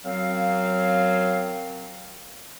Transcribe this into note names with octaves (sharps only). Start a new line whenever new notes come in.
F#2 F#3 C4 F5